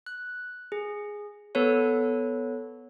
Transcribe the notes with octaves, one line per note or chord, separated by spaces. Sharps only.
F#6
G#4
B3 A4 B4 C#5